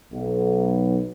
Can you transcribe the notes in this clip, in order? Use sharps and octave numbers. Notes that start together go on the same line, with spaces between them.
B1